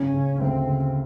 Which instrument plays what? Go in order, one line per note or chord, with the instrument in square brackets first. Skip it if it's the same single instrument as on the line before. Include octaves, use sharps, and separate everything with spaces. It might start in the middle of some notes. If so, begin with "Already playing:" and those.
Already playing: [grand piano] C#3 [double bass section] C#4
[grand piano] C#3
[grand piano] D2 [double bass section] C4
[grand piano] C#3